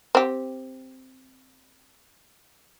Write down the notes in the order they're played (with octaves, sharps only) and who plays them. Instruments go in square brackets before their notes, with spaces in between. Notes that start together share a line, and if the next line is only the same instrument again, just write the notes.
[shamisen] C4 G4